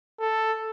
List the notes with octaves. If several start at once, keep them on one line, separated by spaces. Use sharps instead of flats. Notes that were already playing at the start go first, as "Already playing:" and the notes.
A4